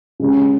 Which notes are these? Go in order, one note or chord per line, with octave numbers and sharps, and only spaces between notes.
C#3 G#3 C#4